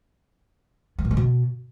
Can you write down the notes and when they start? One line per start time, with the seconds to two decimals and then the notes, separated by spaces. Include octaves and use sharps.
0.99 G#3
1.05 A#2
1.11 G#3
1.17 B2